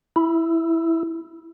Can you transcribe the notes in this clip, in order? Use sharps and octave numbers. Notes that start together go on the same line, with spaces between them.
E4